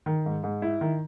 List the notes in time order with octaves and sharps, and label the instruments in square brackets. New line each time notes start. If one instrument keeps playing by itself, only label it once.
[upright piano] D#3
G#2
G#2
E4
D#3